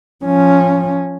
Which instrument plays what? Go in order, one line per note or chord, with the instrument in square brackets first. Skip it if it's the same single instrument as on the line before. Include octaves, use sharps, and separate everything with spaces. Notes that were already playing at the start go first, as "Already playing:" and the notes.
[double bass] F3 C#4